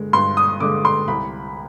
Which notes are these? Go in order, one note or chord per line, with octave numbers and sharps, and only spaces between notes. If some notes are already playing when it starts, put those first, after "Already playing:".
Already playing: G2 D3 G#3
G2 C6
D#6
D3 G#3 D6
C6
C2 B5